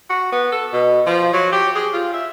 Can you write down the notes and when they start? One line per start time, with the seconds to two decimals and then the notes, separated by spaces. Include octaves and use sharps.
0.10 F#4
0.32 B3
0.52 A4
0.73 B2
1.06 F3
1.33 F#3
1.52 G4
1.75 G#4
1.93 F4
2.14 E5